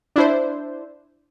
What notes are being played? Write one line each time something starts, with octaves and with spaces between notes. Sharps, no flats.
D4 E4 C5